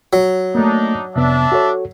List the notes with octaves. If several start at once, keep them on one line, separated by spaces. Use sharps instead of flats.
F#3
A3 A#3 D4 D#4
F2 C3 B3 D4 E5
F#4 A4 C#5